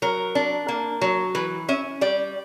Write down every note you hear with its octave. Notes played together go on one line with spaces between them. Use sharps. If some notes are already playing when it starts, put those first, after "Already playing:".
F#3 A#4
D4
A#3
F#3
E3 B4
C#4 E5
G3 D5